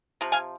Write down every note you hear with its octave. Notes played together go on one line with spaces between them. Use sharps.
C3 F3
F5 G#5